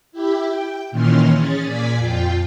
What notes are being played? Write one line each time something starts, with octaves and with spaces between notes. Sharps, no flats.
E4 G4
G5
A#2 D#3 E3 C#4 C6 F6
C#4 G#4 A6
A#2 D5 G#5 G#6 B6
F2 F4 G5